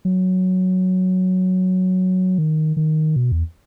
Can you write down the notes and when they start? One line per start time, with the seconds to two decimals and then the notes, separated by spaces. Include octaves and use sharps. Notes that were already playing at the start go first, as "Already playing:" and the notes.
0.05 F#3
2.38 D#3
2.77 D#3
3.16 B2
3.32 E2